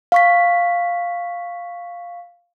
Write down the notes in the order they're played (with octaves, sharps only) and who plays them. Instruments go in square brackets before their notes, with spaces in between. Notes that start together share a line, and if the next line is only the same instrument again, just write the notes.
[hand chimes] F5 C#6 B6